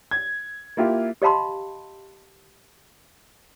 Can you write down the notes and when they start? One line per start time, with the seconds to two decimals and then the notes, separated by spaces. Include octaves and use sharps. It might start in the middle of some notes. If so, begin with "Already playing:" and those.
0.11 G#6
0.77 A#3 E4 F4 G4
1.22 G4 D#5 F5 A5 B5 C6